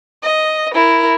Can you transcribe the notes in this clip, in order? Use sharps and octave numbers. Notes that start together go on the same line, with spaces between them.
D#5
E4 A#4